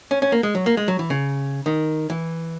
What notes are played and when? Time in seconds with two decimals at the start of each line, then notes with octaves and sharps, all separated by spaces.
0.11 C#4
0.22 C#4
0.32 A#3
0.43 G#3
0.55 F#3
0.66 A#3
0.77 G#3
0.88 F#3
0.99 E3
1.10 C#3
1.66 D#3
2.10 E3